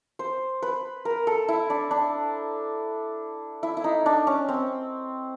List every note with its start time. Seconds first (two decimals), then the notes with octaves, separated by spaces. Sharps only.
0.19 C5
0.62 B4
1.05 A#4
1.27 A4
1.48 E4
1.70 D4
1.91 D4
3.63 E4
3.77 E4
3.84 D#4
4.06 D4
4.27 C#4
4.49 C4